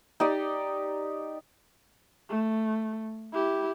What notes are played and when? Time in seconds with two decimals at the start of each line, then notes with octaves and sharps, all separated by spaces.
0.20 D#4 G4 D5
2.29 A3
3.33 E4 G4